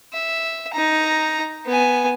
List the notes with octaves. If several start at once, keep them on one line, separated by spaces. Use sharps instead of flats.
E5
D#4 A#5
B3 G#5